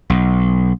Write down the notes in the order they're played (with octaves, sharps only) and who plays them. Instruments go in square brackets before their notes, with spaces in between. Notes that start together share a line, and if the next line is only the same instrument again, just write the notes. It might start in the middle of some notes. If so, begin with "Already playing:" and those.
[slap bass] B1